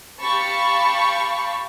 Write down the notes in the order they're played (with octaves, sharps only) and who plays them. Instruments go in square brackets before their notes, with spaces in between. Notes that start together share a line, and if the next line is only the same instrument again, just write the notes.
[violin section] G4 F5 A5 B5 C#6